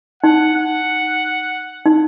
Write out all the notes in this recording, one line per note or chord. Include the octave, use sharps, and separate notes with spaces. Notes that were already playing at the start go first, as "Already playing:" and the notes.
D#4 F#5
F#5
D#4